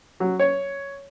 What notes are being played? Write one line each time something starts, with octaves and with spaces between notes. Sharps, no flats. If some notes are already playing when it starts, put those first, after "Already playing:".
F#3
C#5